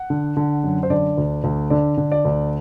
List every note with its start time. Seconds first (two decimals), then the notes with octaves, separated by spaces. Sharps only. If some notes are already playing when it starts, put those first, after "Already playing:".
Already playing: F#5
0.10 D3
0.37 D3
0.64 F#2
0.83 C5
0.90 D3 D5
1.18 D2
1.44 D2
1.70 D3 D5
1.97 D3
2.12 D5
2.25 D2